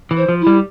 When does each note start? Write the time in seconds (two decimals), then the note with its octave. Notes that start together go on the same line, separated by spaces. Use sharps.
0.11 E3
0.17 C5
0.29 F3
0.41 E4
0.47 G3